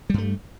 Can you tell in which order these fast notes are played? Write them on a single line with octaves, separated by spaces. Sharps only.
G3 G2 A3